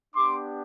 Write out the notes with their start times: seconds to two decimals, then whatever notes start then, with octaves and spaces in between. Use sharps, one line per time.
0.15 B3 D4 G4 C6 D6